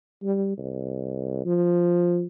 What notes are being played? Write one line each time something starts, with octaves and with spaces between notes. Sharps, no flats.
G3
C2
F3